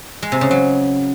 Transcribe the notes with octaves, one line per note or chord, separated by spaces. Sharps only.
G#3
C3
C#3
F#3